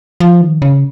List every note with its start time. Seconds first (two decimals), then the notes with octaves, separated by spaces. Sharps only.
0.20 F3
0.41 D#3
0.62 C#3